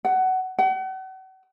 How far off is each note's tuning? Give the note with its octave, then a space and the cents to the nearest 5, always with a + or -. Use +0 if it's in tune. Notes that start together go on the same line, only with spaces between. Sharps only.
F#5 +20
F#5 +40